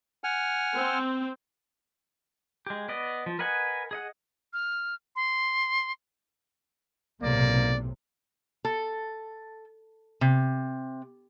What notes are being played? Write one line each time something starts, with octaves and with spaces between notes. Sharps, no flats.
F#5 G#5 F6
C4
G#3 G4
B3 D5 D#5
F3
A#4 B4 D#5 F#5 G#5
G#4 D#5 F#5
F6
C6
B1 A2 C3 A#3 D5
A4
C3